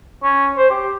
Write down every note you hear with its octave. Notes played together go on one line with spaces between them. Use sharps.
C#4
C5
G4